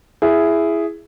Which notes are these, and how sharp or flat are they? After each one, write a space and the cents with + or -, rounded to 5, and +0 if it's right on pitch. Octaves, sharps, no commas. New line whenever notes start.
E4 +10 G#4 +0